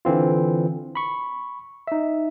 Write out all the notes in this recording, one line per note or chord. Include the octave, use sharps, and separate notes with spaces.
D3 E3 C4 F4
B5 C#6
D#4 E5